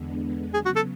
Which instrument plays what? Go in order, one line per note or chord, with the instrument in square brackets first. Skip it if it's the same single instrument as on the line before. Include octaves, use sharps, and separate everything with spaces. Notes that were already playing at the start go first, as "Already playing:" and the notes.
Already playing: [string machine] E2 D3 G#3 B3 D4
[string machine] C#3 F#3 B3 [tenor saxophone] G#4
[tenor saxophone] F#4
A4